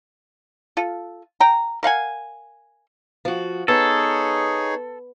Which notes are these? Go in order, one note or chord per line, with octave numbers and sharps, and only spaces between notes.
F4 A4
G5 A#5
A#4 F5 F#5 G#5
F3 F#4
B3 D#4 G#4 A4 C#5